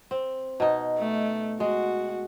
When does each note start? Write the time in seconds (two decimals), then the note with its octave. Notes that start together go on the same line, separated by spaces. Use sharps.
0.11 C4
0.60 B2 D#4
0.98 A3
1.60 G#3 F#4